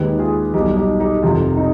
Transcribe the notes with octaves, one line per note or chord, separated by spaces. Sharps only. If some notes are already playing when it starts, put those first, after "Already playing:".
Already playing: D#2 D#3 G#3 G4 B4
F4 G#4
B1 B2 G3 D#4 G4
D#4 G4
D#4 G4
F1 F2 C3 D#3 F4
D#4